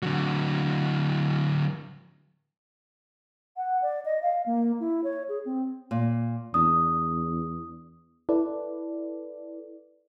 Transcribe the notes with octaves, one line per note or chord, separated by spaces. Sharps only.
D3 F#3
F#5
D5
D#5
F5
A#3
E4
C#5
G#4
C4
A#2
E2 D4 D#6
E4 A4 B4 D5